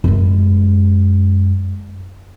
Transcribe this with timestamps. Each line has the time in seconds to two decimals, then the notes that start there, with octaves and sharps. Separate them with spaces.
0.04 F#2 G#3